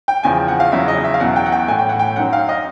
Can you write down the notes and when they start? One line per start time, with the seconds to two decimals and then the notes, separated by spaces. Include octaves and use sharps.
0.08 G5
0.23 E2 C#3 F3 G#5
0.48 F#5
0.60 F5
0.72 E2 C#3 F#3 E5
0.88 D#5
1.04 E5
1.14 F5
1.20 E2 B2 F#3 F#5
1.36 G5
1.46 F#5
1.52 G5
1.68 A2 E3 G#5
1.79 G5
1.89 F#5
1.99 G5
2.16 F#2 D#3 F#3 F#5
2.33 F5
2.49 D#5